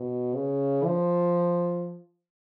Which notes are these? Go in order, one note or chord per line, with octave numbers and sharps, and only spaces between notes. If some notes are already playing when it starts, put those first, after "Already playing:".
Already playing: B2
C#3
F3